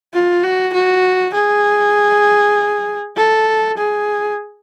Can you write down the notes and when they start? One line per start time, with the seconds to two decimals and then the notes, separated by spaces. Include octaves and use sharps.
0.13 F4
0.43 F#4
0.74 F#4
1.34 G#4
3.16 A4
3.78 G#4